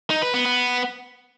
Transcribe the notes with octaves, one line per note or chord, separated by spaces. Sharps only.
D#4
B4
B3
B3